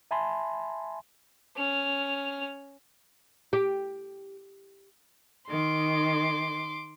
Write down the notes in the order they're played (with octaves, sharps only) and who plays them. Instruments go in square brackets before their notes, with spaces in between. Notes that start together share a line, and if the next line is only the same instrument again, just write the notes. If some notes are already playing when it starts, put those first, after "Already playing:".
[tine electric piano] E5 G#5 A5 B5 C6
[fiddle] C#4 F6
[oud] G4
[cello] D#3 [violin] C6 D6